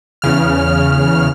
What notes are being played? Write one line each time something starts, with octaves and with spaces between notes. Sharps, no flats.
E2 C#3 F6